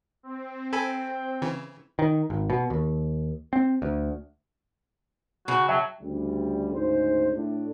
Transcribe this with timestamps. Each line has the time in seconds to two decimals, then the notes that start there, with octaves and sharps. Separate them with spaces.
0.23 C4
0.73 A4 G5 G#5 B5
1.42 C#3 E3
1.99 D#3
2.30 G#1
2.50 B2
2.70 D#2
3.53 C4
3.82 D2
5.48 C#3 F#4
5.69 F#3 E5 G5 A5
6.02 D2 C#3 G3
6.74 D2 G#2 C#3 C5
7.35 A2 A3 D4